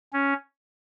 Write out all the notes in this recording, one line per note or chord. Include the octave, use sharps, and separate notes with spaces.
C#4